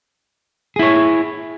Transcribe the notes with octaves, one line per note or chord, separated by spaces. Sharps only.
E4 G#4 C#5